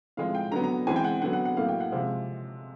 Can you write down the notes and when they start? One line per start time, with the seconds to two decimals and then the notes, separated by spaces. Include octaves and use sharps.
0.17 A2 F3 G#3 C4 F5
0.35 G5
0.52 D3 F#3 B3 A#5
0.64 A#5
0.87 E3 G#3 C4 G#5
0.96 G5
1.04 F#5
1.22 D3 F#3 B3 F#5
1.33 F#5
1.45 F#5
1.57 A2 F#3 A#3 F5
1.68 G5
1.80 F#5
1.92 C3 F3 G#3 C4 F5